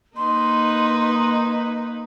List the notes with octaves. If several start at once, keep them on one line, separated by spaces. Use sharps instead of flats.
A#3 D#4 B4 C6